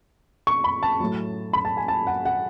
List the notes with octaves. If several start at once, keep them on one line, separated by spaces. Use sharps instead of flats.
C#6
B5
A5
A2 F#3
B5
A5
G#5
A5
F#5
F#5